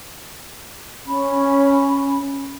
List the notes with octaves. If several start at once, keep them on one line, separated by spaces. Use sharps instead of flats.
C#4 B5